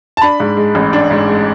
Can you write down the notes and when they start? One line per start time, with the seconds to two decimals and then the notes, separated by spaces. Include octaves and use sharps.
0.17 A5
0.22 D4 B5
0.40 G#2
0.57 G#3
0.75 A1
0.93 D4
1.11 G#2
1.28 G#3